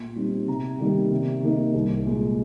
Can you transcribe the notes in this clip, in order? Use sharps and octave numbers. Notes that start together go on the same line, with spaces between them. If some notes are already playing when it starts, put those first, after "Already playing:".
Already playing: A#2 C6
G3 C4 D#4
C3 A#5
D#3 G3 A#3
C3
D#3 A#3 D#4
C2
A#2 G#3